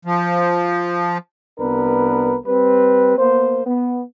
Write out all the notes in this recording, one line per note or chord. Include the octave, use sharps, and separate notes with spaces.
F3
C2 B3 D4 A#4 B4
G3 C4 B4
A#3 B3 C5
B3